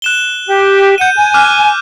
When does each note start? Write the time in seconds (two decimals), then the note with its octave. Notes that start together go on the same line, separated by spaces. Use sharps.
0.02 F#6 E7 G7
0.47 G4
0.98 F#5 G6 D#7
1.16 G#5
1.34 D6 F6 F#6